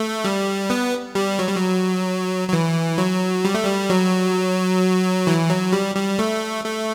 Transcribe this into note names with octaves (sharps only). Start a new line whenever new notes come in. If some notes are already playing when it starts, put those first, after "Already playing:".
Already playing: A3
G3
B3
G3
F#3
G3
F#3
F#3
E3
F#3
G3
A3
G3
F#3
E3
F#3
G3
G3
A3
A3